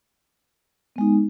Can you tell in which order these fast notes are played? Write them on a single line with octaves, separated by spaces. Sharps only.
B3 G#3 D#4